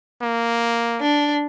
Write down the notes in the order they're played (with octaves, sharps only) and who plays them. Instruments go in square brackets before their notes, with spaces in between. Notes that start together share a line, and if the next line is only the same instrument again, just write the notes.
[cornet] A#3
[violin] D4